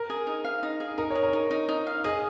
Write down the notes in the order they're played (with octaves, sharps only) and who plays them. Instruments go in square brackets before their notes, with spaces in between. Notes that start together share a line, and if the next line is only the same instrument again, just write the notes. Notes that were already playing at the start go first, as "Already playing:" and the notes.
Already playing: [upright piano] A#4
[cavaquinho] G#4
D#4
F5
D#4
G#4
[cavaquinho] D#4 [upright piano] A#4
[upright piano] C#5
[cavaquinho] G#4
[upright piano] A#4
[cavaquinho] D#4
D#4
D#4
F5
[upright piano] G#4 [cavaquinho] D#5